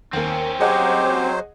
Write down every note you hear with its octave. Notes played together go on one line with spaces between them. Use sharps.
D#2 A#3 C4 C#4
F#3 G4 G#4 C5 D#5 F#5